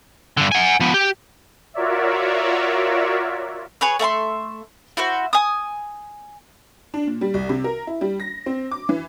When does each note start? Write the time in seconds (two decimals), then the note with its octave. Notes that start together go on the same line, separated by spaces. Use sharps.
0.37 G2 D3
0.52 F#5 G#5
0.80 F3 B3
0.94 G4
1.74 F4 F#4 A#4 C#5 D5 E5
3.81 G#4 B4 C#5
3.99 A3 E5 A5 C6
4.97 E4 F#4 C5
5.33 G#5 D#6
6.94 D4
7.07 A#2
7.21 G3
7.34 C2
7.49 C3
7.64 A#4
7.87 E4
8.01 G3
8.20 A#6
8.46 C4
8.71 D6
8.89 E3